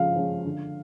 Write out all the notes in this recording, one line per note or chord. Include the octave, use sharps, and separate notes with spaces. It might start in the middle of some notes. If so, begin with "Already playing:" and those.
Already playing: C#3 F3 G#3 F5
F3 G#3 C#4
D3